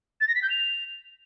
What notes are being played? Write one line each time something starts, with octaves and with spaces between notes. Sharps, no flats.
A6
A#6
B6
G6
F7